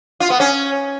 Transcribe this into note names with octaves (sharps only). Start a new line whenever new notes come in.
F4
B3
C#4